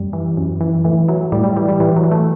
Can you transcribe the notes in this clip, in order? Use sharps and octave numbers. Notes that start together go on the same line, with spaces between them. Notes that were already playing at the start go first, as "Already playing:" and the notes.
Already playing: F#2 G3
E3
F#2
E3
A2 E3
E3 F#3
A2 G3
G3
E3 G3
G3
A2 E3
F#3
E3
A3